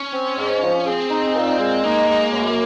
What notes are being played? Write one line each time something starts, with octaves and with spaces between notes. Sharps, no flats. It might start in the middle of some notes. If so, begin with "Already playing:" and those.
Already playing: C#4
C4
G#2
F3
C4 G#4
D#4
A#2
G#3
A#3 D#4
G#3
F#2